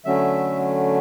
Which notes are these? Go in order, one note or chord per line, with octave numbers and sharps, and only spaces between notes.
D3 F#3 A3 C#4 E5